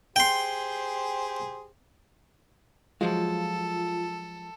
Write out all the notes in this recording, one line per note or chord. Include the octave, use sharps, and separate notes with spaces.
G4 G#4 C5 G5 C6
F3 F#3 G#3 F4 A4